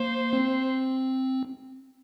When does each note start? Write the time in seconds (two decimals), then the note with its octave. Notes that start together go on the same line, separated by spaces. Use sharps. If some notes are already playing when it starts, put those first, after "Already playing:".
Already playing: A#3 C5
0.33 C4